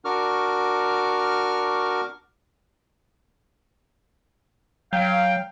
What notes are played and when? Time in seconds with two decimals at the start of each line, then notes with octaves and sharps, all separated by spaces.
0.05 D4 F#4 A#4 C#6 D6 F6
4.93 F#3 F5 G5